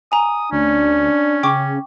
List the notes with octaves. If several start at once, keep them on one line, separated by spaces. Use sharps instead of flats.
G#5 A#5 D#6
D2 C#4 D4
C#3 G5 C#6 D6